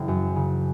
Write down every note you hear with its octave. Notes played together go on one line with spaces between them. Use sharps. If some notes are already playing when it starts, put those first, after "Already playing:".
Already playing: F#1 C#3 E3
F#2
C#3